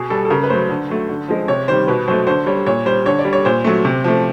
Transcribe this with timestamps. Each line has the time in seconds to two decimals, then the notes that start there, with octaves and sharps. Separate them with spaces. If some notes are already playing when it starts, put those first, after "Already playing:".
Already playing: B2 G#4
0.10 G3 A4
0.25 A4
0.30 C#3 A#4
0.44 B4
0.50 F#3 A3 C5
0.70 D3
0.89 F#3 A3
1.09 D3
1.28 F3 G#3
1.48 C3 C#5
1.68 D#3 G3 C5
1.87 B2 B4
2.08 F#3 A3 C5
2.27 D3 C5
2.46 G3 C#5
2.67 A#2 C#5
2.86 G3 C5
3.06 D3 C#5
3.19 D5
3.25 G3
3.33 C#5
3.45 A#2 C5
3.64 F#3 A3
3.85 C3
4.04 F3 A3